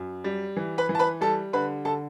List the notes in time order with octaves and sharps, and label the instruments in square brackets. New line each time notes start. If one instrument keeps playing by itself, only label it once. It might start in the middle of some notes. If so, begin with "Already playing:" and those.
Already playing: [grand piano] F#2
G3
E3
B4 B5
E3
A5
B4 B5
G3 A4 A5
D3 B4 B5
D3 A4 A5